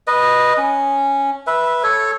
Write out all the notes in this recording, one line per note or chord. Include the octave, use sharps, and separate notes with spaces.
B4 D#5
C#4
B4 E5
A4 C#5